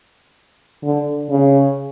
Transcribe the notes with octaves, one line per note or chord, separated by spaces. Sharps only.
D3
C#3